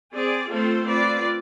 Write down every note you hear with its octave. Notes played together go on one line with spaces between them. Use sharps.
C4 G#4 D5
A3 C4 F4 A4 C5
C4 F4 B4 D5